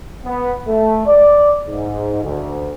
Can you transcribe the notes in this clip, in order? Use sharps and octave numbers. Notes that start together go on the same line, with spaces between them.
B3
A3
D5
G#2
D2